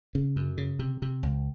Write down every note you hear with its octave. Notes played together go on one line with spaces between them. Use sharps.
C#3
F#2
C#3
C3
C3
C#2